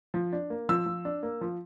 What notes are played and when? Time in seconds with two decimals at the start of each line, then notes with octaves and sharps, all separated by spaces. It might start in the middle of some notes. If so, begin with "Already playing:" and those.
0.14 F3
0.33 D4
0.50 A#3
0.69 F3 E6
0.86 F3
1.05 D4
1.23 A#3
1.41 F3